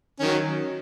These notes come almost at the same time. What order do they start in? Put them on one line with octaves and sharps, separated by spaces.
C#4 D#3 F#3